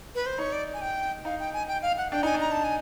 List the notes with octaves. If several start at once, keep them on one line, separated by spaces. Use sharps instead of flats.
B4
C5
D#4 C#5
D5
G#5
G5
D#4 F5
G5
G#5
G5
F5
F#5
D4 G5
D#4 G#5
D4
A#5
A5
G#5